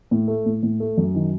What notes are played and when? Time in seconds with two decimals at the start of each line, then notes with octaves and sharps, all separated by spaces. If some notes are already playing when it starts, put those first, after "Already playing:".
0.11 A2
0.28 A3
0.46 A2
0.63 A2
0.80 A3
0.97 F#2
1.15 D#3